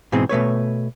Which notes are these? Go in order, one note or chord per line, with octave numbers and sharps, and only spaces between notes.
G#2 B2 E3 C4 G#4
B2 A3 B4 C#5